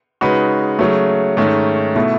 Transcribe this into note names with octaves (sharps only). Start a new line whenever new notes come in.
C#3 G#3 D#4 F#4 B4
C#3 F#3 A3
G#2 D#3 A3 C#4
B2 A3 E4